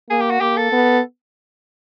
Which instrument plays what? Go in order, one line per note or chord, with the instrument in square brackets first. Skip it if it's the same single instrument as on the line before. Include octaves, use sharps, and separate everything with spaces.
[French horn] A#3 [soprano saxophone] G#4
[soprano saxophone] G4
F#4
[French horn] A#3 [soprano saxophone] G4
[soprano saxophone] A4
[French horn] B3